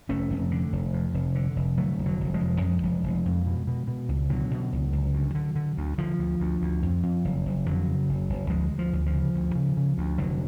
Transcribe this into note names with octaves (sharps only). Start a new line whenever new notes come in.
F1 A3 C#4
F1
D3
F1
F2
F1
D3
F1
D3 F#3 A3
F1
D3 F#3
F1
F3 G#3
F1
F2 F3 G#3
F1
F1
F2
B2
B2
B2
C#2
B2 D3 F#3
B2
C#2
C#2
D2
D3
D3
D2
D3 F3
D2
D2
D2
F2
F2
F#1
F#1
F2 D3 F#3
C#3
F#1
F#1
D2 F3 G#3
D2
F3
D2
F3
C#3
D2
C#3
C#3
D2
F1 D3 F#3